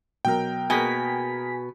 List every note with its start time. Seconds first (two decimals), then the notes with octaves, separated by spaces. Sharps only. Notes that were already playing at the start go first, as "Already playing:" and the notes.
0.25 B2 F#3 A#4 G5
0.70 B2 A#3 G#4 A#4 G#5 B6